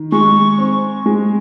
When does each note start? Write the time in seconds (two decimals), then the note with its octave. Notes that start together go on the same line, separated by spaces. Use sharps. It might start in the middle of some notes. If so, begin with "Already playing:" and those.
Already playing: D#3
0.12 G#3 C#6
0.58 C4
1.06 G#3